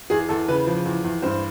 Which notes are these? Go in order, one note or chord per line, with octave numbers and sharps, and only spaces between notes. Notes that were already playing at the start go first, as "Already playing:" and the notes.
E2 G#4
E2 A4
C#3 B4
F3
E2
E2
G2 C5